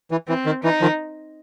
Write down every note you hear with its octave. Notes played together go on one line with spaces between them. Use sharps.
E3
E3 C4
D#3
E3 D#4
D#3 F3